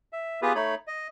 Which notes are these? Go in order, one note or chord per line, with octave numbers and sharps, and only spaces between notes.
E5
B3 F4 G4 G#4 B4
A3 D#4 C#5 B5
D#5